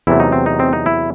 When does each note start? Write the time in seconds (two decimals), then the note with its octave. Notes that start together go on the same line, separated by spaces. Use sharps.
0.07 E2 C3 F#3 A3 E4
0.20 D#4
0.32 C4
0.46 D#4
0.60 C4
0.73 D#4
0.86 E4